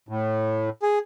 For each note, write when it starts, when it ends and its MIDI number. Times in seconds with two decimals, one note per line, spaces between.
0.09 0.70 45
0.83 0.99 68